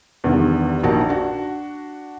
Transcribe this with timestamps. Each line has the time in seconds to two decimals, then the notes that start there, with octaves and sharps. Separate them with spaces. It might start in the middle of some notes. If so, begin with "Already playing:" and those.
0.24 E2 G2 D3 D#3
0.83 A#1 D#4 F#4 A#4 A5
1.09 D4 F#4